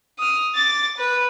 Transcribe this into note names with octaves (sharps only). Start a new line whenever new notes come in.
D#6 F6
D6 A6
B4